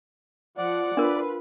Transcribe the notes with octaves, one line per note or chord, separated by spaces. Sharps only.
F3 D5 F#5
D4 F4 A#4 B4